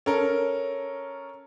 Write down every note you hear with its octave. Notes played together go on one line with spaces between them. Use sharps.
C#4 A4 A#4